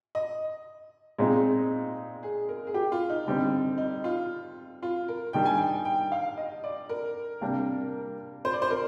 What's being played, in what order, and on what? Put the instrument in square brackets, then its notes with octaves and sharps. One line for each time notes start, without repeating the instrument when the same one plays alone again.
[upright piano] D#5
[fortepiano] A#2 G#3 C4 D#4
[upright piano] G#4
A#4
G#4
G4
F4
D#4
[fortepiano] D3 G3 C4
[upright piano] D#4
F4
F4
A#4
[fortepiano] D#3 G3 D4 [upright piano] G5
[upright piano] G#5
G5
G5
F5
D#5
D5
A#4
[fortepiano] C3 G3 A#3 D4
[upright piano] C5
D5
C5
A#4